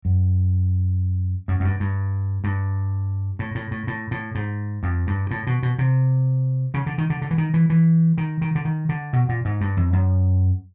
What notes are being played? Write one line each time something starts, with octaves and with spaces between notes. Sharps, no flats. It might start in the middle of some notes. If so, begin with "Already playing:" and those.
F#2
F#2
F#2
G2
G2
G2
A2
A2
A2
A2
A2
G#2
F2
G2
A2
B2
B2
C3
C#3
D3
D#3
D3
D3
E3
D#3
E3
E3
D#3
D#3
D3
D#3
D3
B2
A#2
G#2
G2
F2
F#2